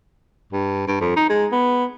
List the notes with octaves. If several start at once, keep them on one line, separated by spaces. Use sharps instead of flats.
G2
G2
F2
D#4
G#3
B3